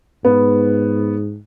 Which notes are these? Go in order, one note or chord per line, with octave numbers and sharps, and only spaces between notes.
G#2 B3